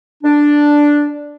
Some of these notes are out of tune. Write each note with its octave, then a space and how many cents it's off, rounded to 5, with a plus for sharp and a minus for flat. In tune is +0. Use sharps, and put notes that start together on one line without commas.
D4 +0